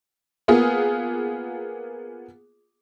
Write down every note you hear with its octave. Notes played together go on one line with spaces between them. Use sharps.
A#3 B3 F4 G#4